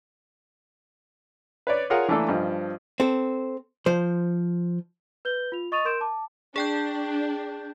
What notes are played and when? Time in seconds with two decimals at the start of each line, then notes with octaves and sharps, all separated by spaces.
1.67 B4 C#5 D5
1.90 F4 G#4 A#4 C#5 F#5 D#6
2.08 E3 A3 A#3 D4 A4
2.29 G2 F3 D#5
3.00 C4 A4
3.86 F3 C5
5.25 B4 G6 G7
5.52 F4 F7
5.72 D#5 C#6 D#6 A6 D#7 F7
5.85 A#4 C6 G6 D7 E7
6.01 A5 D6
6.56 D4 G#4 G5 G6